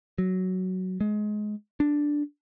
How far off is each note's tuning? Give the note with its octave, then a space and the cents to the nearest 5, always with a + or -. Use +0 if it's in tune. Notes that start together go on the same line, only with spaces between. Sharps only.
F#3 +5
G#3 +20
D4 +0